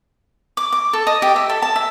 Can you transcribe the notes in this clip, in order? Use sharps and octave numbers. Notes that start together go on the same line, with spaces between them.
D6
D6
A4
D#5
G4
E5
A4
A5
E5